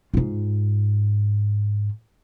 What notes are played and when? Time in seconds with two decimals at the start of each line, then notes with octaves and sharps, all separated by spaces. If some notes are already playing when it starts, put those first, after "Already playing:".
0.14 G#2 F4